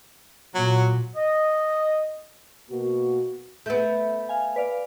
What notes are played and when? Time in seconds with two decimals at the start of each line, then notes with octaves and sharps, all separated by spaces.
0.54 A#2 F#3
1.15 D#5
2.70 B2 A#3 F#4
3.66 A3 B3 G6
4.29 F5 G#5
4.56 B4 D5 F5